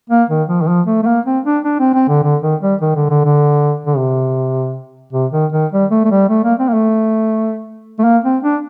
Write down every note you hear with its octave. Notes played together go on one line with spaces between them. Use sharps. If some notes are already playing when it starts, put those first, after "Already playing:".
A#3
D#3
F3
D#3
F3
A3
A3
A#3
C4
D4
D4
C4
C4
D3
D3
D#3
G3
D#3
D3
D3
D3
D3
C3
C3
D#3
D#3
G3
A3
A3
G3
A3
A#3
C4
A#3
A3
A3
A#3
C4
D4